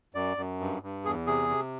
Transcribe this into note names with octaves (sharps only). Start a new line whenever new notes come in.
F#2 D5
F#2
G2
G2
E2 G#4
C3 G#4
C3